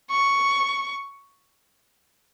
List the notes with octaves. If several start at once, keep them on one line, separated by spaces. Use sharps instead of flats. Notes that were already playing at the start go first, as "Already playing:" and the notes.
C#6